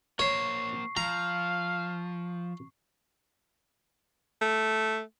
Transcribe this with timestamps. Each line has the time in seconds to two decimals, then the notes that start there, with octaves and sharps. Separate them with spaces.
0.19 A#3 C5 C#5 C#6 C7
0.97 F3 F5 A#5
4.42 A3